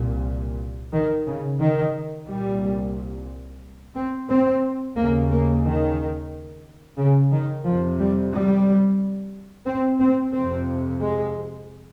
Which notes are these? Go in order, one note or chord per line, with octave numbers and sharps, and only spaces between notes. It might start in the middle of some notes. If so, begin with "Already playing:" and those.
Already playing: C2 A#2
D#3
C#3
D#3
C2 A#2 G3
C4
C4
D#2 C#3 A#3
A#3
D#3
C#3
D#3
F2 C3 F3
G3
G3
C4
C4
F2 C3 C4
G#3